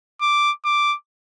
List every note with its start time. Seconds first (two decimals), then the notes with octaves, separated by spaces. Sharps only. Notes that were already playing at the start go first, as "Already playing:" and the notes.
0.21 D6
0.65 D6